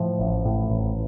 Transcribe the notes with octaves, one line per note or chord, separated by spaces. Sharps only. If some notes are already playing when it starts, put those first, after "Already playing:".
Already playing: A2 F3
A1
A2
A1